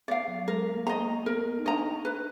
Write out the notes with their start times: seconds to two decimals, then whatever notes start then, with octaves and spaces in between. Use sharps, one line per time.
0.08 B3 D5
0.11 F5
0.28 F#3
0.47 G#3 A#4
0.67 B3
0.74 A#3
0.87 D#5 A#5
1.00 A#3
1.26 B3 A#4
1.59 D#4
1.65 D4 D#5 A#5
2.05 B4